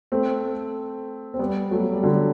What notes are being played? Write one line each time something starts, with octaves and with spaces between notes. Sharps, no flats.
A3 C4
C4
G3 B3
F#3 A3
G3
D3 F#3